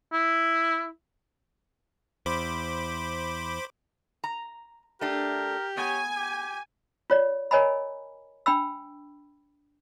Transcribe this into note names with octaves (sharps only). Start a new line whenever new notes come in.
E4
E2 C5 B5 D6
A#5
A3 D4 G4 A#4
B3 C#5 G#5
G4
F4 C#5 D5
A#4 C#5 D#5 G#5 A#5 B5
D4 G5 B5 E6